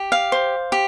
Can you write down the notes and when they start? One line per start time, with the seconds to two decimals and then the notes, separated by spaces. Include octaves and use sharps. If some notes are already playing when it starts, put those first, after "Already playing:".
Already playing: G4
0.12 F5
0.32 C5
0.72 G4